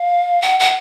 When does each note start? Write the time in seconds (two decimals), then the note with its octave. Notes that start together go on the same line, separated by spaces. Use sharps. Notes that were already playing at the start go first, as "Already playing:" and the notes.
Already playing: F5
0.42 F#5
0.60 F#5